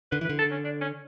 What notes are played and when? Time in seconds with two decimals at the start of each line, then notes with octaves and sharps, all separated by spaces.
0.12 D3 B4
0.21 E3
0.25 B4
0.30 D3
0.39 A4
0.51 C#4
0.64 D4
0.81 C#4